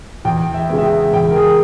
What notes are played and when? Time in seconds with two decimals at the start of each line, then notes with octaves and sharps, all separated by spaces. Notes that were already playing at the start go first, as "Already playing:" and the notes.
0.25 E2 G5
0.54 E5
0.69 C#3 G#3 B3
0.79 E5
0.84 G5
1.13 E2 G5
1.31 A#4
1.36 G#4